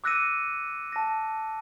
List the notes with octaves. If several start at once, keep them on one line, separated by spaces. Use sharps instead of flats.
D6 E6 F#6 A#6 C#7 D#7
A5 A#6